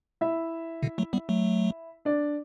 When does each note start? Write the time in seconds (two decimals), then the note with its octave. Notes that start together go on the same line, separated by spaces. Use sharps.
0.21 E4 E5
0.83 B2 D3
0.98 F#3 A3
1.13 G3 B3
1.29 F#3 A3
2.05 D4 D5